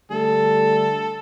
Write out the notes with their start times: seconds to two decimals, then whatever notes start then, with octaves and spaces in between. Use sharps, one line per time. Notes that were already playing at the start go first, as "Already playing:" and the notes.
0.11 D3 G3 A3 A4